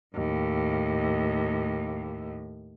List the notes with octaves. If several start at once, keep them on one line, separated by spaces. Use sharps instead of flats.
D#2 A2